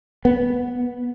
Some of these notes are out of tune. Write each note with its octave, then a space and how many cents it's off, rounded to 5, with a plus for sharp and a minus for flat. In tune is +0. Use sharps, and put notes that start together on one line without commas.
B3 -10